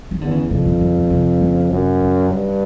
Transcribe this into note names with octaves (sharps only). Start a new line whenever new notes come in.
D#3
E2 D3
C#3
F2 C3
A#2
A2
B2
C3
C#3
F#2 C3
C#3
G2